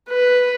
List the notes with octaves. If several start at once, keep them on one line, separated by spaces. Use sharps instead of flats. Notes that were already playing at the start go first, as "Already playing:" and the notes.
B4